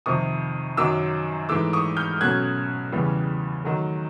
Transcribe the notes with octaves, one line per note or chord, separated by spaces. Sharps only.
F2 C3 D#3 C#6 D#6
F#2 D#3 F#3 D6 E6
G#2 E3 A3 D6 E6
C#6 D#6
F6 G6
B2 F#3 A3 C#4 F#6 G#6
E2 C#3 E3 G3
D#3 F#3 A3